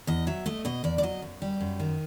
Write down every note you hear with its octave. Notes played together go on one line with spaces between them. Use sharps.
E2 D#5
F#3 E5
A3 D#5
B2 D#5
E2 D5
D5
F#3 D#5
F#2
G3
F#2
D#3